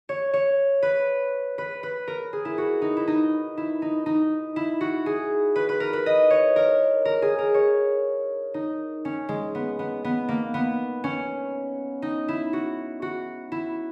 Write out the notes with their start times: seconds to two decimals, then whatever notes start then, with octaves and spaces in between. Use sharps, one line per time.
0.09 C#5
0.33 C#5
0.82 B4
1.58 B4
1.83 B4
2.08 A#4
2.33 G#4
2.45 E4
2.58 F#4
2.82 D#4
2.97 E4
3.07 D#4
3.57 E4
3.82 D#4
4.06 D#4
4.56 E4
4.81 F#4
5.06 G#4
5.56 B4
5.69 B4
5.80 A#4
5.93 B4
6.06 D#5
6.30 C#5
6.56 A#4
7.05 A#4
7.22 G#4
7.38 A#4
7.54 C#5
8.54 D#4
9.05 C#4
9.29 G#3
9.55 B3
9.79 B3
10.04 B3
10.28 A#3
10.54 B3
11.04 C#4
12.02 D#4
12.28 E4
12.53 F#4
13.02 F#4
13.52 E4